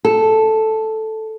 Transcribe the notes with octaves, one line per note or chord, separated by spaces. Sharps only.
A4